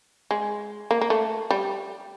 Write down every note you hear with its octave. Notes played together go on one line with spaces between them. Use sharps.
G#3
A#3
A#3
A3
G3